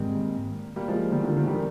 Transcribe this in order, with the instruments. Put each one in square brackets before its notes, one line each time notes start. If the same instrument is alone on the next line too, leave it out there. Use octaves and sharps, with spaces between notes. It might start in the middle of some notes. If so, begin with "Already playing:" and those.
Already playing: [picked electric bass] G#2 D#3 G#3 C4 [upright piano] G3 A#3
[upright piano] G3 A#3
F3 G#3
D#3 G3
D3 F3
D#3
D#3 G3